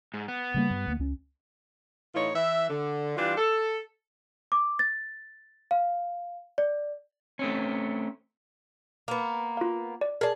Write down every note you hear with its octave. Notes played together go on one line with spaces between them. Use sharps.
G#2
B3
C#3 G3 A#3
G2
D2 A#3
C#2 C#4
A2 E3 D#4 F4 C#5
E3 E5
D3
E3 G3 D4 F4
A4
D6
A6
F5
D5
A3 C4 C#4
A#3 B3
F4 F5
D5
G#4 A#4 D5 A5